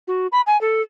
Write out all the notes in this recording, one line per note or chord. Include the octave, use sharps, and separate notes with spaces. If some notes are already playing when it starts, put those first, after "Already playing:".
F#4
B5
G#5
A4